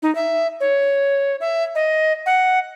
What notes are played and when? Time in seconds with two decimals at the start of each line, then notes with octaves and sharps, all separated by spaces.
0.02 D#4
0.15 E5
0.60 C#5
1.40 E5
1.75 D#5
2.26 F#5